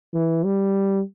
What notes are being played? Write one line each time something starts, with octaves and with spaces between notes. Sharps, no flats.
E3
G3